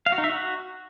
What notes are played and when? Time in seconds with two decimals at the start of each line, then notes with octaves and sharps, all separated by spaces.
0.06 F5
0.12 F#4
0.18 D#4
0.24 E5
0.30 F#4